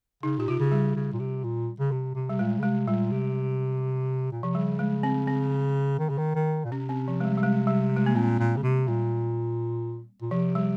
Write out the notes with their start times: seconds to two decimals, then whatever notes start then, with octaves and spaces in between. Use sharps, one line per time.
0.23 C#3 D#4
0.38 A#2 G4
0.48 C3 F4
0.60 C#3
0.72 G3
0.96 C#3
1.13 A#2
1.20 C3
1.44 A#2
1.80 C#3
1.91 C3
2.15 C3
2.29 C3 G3
2.39 A#2 G#3
2.59 C#3
2.63 C3 G#3
2.87 A#2 G3
3.11 C3
4.32 A#2
4.43 C3 F3
4.55 C#3 G3
4.79 G#3
5.03 C4
5.27 C4
5.99 D#3
6.09 C#3
6.18 D#3
6.35 D#3
6.65 A#2
6.71 C3 C#4
6.89 C4
7.08 F3
7.20 G#3
7.25 G3
7.38 G3
7.43 G#3
7.67 G3
7.96 G#3
8.06 A#3
8.15 A#2 C4
8.39 A#2
8.57 C#3
8.63 C3
8.87 A#2 G3
10.21 A#2
10.31 C3 F3
10.55 G3